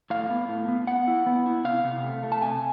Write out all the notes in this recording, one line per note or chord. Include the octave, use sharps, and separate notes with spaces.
A2 F5
B3
A2
B3
B3 F#5
E4
B3
E4
C3 F5
C3
A3
A3
A5
C3 G#5